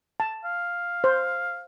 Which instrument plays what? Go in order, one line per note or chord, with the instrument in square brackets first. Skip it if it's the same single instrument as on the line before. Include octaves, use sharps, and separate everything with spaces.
[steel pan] A5
[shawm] F5
[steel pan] C5